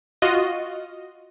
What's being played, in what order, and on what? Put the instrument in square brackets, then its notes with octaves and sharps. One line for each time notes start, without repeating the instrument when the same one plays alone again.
[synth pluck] F4 F#4 D#5